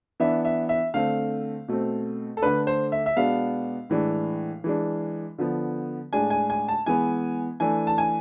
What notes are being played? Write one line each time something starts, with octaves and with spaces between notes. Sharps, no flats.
E3 B3 D4 E5
E5
E5
D3 A3 C4 F5
B2 A3 C4
A4
D3 A3 D4 B4
C5
E5
E5
B2 G#3 B3 D4 F5
A2 E3 G#3 D4
E3 G#3 D4
D3 F3 B3
A2 G#3 D4 G#5
G#5
G#5
A5
E3 G#3 B3 G#5
E3 A3 D4 G#5
A5
G#5